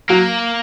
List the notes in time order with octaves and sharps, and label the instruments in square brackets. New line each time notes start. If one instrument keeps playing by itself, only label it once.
[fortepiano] F#3 [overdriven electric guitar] A#3